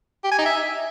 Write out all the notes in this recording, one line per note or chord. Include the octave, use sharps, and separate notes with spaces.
G4
G#5
D#4
E5